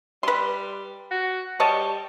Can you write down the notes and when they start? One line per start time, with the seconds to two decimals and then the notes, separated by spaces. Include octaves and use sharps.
0.23 G3 B4 C6
1.11 F#4
1.60 G3 C#5 D#5 A5